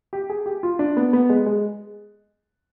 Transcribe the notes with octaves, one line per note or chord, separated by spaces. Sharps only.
G4
G#4
G4
F4
D4
B3
B3
G#3
G#3